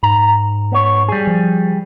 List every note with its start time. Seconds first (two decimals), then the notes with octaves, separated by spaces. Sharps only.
0.03 G#2 A#5
0.72 B3 C#5
1.09 G3 G#4
1.27 F3